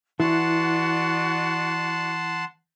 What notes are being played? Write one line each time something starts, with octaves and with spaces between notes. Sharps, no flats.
E3 E4 F#4 D5 F#5 A5 C6